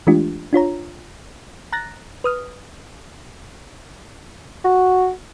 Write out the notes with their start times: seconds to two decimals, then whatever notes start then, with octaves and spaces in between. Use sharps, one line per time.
0.07 E3 G#3 A3 D4 F4 G4
0.53 D4 F4 C#5 A#5
1.73 A#5 F#6 A6 A#6
2.24 B4 D#6 F6
4.64 F#4